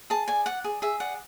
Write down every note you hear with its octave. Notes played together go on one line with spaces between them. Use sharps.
G#4 A5
D5 G#5
D5 F#5
G#4
G#4 E5
D5 F#5